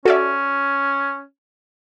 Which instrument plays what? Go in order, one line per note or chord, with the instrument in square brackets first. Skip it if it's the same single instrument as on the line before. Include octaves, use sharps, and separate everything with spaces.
[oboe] C#4 [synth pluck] F#4 [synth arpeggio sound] A4 D5 E5